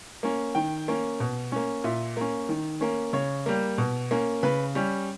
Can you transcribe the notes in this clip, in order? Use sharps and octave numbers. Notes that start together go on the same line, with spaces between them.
A#3 C#4
D#3 G5
A#3 C#4
B2
A#3 C#4
A#2 E5
A#3 C#4
D#3
A#3 C#4
C#3 C#5
G3 A#3
B2
A#3 C#4
C#3 B4
G3 C#4